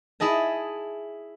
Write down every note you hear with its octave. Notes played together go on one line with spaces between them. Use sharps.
E4 G#4 D#5 A5